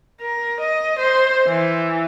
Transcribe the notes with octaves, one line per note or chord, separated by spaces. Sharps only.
A#4
D#5
C5
E3